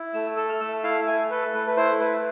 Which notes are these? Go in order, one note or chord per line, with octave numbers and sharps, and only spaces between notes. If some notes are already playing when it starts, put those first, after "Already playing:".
Already playing: E4
A3 E6
A4 E6
F6
A3 E6
E4 F5
A3 G#5
A4 B4
A3 B4
B4
E4 C5
A3 B4